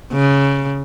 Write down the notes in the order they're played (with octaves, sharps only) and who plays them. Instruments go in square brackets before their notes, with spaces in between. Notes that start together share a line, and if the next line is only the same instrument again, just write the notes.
[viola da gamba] C#3